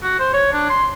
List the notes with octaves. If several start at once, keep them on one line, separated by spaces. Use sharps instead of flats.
F#4
C5
C#5
D4
C6